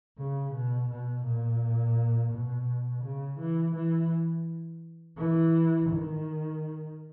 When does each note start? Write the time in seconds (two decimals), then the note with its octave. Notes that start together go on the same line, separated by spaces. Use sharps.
0.18 C#3
0.54 B2
0.90 B2
1.25 A#2
2.33 B2
3.03 C#3
3.39 E3
3.75 E3
5.17 E3
5.89 D#3